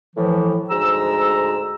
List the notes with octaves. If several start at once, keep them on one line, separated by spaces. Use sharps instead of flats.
A2 E3 F3
D2 G#2 A#5 E6